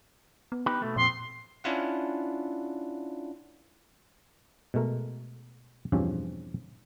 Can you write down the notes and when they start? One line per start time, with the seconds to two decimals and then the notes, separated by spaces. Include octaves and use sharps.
0.52 B3
0.66 D#4 G4 B4
0.82 B2 A3
0.96 F2 A#2 C4 C6
1.64 C#4 D4 E4 F4 F#5
4.74 B2 G#3 A3 A#4
5.92 E2 G2 B2 F3 C4 C#4